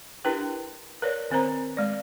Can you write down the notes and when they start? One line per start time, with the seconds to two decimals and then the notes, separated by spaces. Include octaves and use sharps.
0.24 D4 E4 G4 A#4 B4 G5
1.02 A#4 B4 C#5 D5
1.31 D#3 C4 A#4 C5 A#5
1.77 G#3 D5